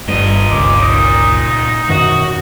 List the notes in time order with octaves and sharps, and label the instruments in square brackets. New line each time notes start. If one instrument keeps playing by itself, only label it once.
[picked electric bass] G1 G2 [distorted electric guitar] A#2 D#5
[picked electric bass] G1 C#2 [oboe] D6
[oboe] D#4
[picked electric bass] F#2 B2 D#3 [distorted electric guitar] F#4